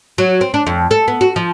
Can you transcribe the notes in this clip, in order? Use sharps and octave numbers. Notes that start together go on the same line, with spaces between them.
F#3
C4
D4
F2
A4
B3
F#4
F3